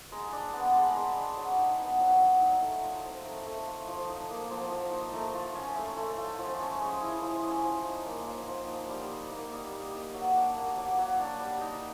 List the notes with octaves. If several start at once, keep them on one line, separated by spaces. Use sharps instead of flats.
G#3 A#5
D4
B3
G#3 C6
B5
A#5
G#3 B5
D4
F#3
D#4
B3
F#3
F#3
D#4
A3
F4
C4
A3 A#5
A3
F4
F3
D#4
A#3
F3 A5
F3
D#4
A3 A#5
F4
C#4
A3 C6
A3
F4
F3 C6
C#4
C#6
G#3
E4 D#6
F3
C#4
F3
D#4
A#3
F3
F3
D#4
G3 D6
D#4
A#3
G3 D#6
G3
D#4
F#3 D6
D4
A#3
F#3 D6
F#3
D4
G3
D#4